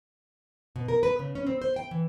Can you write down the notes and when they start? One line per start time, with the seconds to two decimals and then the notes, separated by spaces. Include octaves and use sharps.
0.76 B2
0.88 A#4
1.03 B4
1.19 C#3
1.35 C#4
1.47 C4
1.62 C5
1.76 G5
1.91 E3